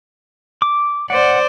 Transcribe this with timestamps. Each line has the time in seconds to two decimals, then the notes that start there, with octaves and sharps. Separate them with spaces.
0.62 D6
1.10 C5 D5 F#5